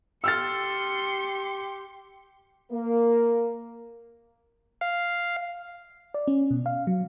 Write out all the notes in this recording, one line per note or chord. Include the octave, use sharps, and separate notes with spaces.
G4 C6 E6 F6 A6 C#7
A#3
F5
D5
C#4
B2
F5
F#3